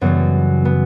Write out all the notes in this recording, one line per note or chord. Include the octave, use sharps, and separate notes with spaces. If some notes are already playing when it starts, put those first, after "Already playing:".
F#2 C#3 E3 G3 B3
B3